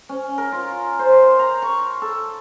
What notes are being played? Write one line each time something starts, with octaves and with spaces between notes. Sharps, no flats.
C#4
A#4
F4
C5
A#5
C#6
A4